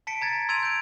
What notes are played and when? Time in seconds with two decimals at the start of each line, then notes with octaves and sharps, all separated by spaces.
0.07 A5 B6 C#7 D7
0.21 A#5 G#6 A6
0.49 C6 E6 G#6 D7 D#7 F7
0.63 G6 D7